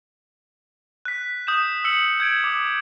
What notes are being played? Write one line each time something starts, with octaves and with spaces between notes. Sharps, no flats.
F#6 B6
D#6 G6 E7
E6 C#7 F#7
G6 G#6 D7
D6